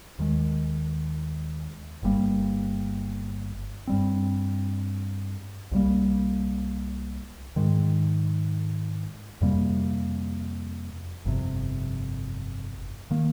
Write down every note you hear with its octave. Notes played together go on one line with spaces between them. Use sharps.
D#2 D#3 G#3
G1 G2 G3 A#3
G2 G3 C4
C2 C3 G3 A#3
G#2 D#3 G#3
F2 C3 G3 A#3
G1 F2 C3
D#3 A#3